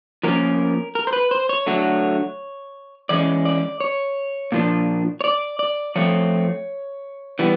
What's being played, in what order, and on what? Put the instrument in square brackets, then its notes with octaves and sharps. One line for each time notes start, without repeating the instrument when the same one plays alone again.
[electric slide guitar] F3 A#3 C#4 A#4
A#4
C5
B4
C5
C#5
D3 F#3 A3
E3 G#3 C#4 D5
D5
C#5
A#2 F3 A#3 D4
C#5
D5
D5
F3 A3 C4 C#5
E3 G3 B3